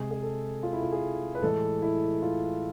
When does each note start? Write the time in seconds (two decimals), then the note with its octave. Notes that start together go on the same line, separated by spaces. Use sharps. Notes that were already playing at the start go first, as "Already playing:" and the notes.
Already playing: C3 G#3 G#4
0.11 G#4
0.23 A4
0.63 F4
0.73 E4
0.82 F4
0.92 G#4
1.35 B4
1.42 A2 E3 G#3 A4
1.82 E4
2.22 F4